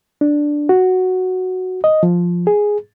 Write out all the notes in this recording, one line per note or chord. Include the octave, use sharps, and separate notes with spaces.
D4
F#4
D#5
F3
G#4